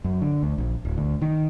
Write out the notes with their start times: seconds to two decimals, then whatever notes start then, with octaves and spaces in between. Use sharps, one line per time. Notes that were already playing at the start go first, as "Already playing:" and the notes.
0.04 F#2
0.22 D3
0.43 D2
0.58 A#1
0.85 D1
0.98 D2
1.22 D#3